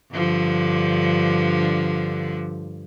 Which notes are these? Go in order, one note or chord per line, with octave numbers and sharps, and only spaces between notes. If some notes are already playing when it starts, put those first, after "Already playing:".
G2 D3 F3